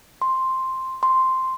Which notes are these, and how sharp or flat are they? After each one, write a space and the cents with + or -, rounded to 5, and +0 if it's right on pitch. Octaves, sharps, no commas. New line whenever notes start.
C6 +5
C6 +0